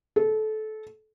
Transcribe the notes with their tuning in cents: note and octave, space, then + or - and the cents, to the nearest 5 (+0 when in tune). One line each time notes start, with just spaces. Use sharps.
A4 -25